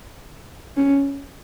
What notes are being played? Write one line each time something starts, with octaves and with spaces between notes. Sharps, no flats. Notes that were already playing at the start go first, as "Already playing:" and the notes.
C#4